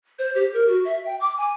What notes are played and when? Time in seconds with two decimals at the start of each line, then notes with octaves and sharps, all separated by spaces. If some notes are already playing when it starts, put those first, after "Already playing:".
0.19 C5
0.35 G4
0.53 A#4
0.68 F#4
0.85 E5
1.06 G5
1.21 D6
1.38 G#5